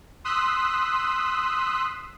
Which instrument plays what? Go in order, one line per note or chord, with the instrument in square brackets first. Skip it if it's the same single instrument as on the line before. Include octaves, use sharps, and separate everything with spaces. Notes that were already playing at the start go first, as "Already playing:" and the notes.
[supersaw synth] C6 D#6 E6 F#6 B6